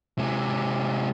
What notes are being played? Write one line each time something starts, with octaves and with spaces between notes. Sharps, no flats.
C3 G#3